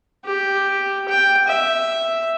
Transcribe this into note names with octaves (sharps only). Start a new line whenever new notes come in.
G4
G5
E5